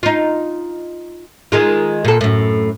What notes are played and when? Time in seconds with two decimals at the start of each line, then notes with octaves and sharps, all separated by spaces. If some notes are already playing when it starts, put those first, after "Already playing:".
0.03 D#4 F4
1.52 D#3 G#3 F4
2.05 A#2 A4
2.21 F#2 A2